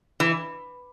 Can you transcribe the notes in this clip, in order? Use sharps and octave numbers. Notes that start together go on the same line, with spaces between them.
E3